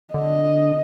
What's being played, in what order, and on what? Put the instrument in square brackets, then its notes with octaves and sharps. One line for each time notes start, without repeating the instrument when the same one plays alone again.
[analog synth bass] D3 [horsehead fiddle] D#5